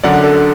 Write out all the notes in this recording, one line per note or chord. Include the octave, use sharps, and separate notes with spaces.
F#2 D3 D5 F#5
A4 D5